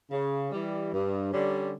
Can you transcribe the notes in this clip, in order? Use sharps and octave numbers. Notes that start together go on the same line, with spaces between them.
C#3
E3 G3
G2
D3 G3 C#4